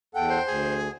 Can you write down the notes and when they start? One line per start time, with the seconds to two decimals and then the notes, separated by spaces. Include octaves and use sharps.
0.15 E2 A4 F#5 G5
0.30 C5
0.46 D2 G#4